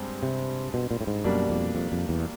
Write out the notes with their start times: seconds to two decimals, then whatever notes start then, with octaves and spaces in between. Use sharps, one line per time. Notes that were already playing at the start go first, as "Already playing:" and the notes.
Already playing: G2 G#3 C4
0.23 C3
0.74 B2
0.91 A#2
1.01 A2
1.07 G#2
1.24 F#2 B2 G3 A#3 D4
1.50 F2
1.75 F2
1.92 F2
2.09 E2